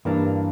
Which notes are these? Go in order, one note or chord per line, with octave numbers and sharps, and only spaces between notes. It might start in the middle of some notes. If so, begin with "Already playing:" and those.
G2 E3 A#3 D4